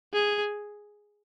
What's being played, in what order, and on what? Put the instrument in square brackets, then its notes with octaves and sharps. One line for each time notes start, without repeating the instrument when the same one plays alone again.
[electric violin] G#4